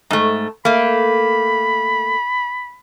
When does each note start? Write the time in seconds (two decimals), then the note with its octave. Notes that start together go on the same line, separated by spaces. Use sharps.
0.10 G#2 A3
0.65 A3 A#3 B5